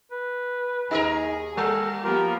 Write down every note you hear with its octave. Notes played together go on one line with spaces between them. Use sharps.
B4
D#2 D#4 G#4 A#4
G3 A4 A#4
F3 A#3 B3 F4 G4 A#4